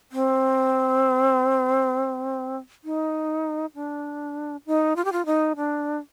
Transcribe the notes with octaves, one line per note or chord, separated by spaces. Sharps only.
C4
D#4
D4
D#4
F4
G4
F4
D#4
D4